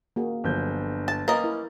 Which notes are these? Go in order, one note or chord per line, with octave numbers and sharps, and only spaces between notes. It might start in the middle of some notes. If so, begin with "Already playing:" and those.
A#3 F#4 G#4
G1 D3 F3 F#3 C5 G6
A5
A#3 C#4 A#4 B4 D#5 A6
E4 A#4